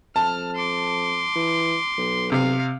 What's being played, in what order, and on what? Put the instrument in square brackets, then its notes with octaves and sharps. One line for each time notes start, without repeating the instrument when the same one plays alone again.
[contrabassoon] F2 [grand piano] A5 [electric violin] F6
[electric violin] C6 D6
[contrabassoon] E3
B1
[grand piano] C3 [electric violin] F5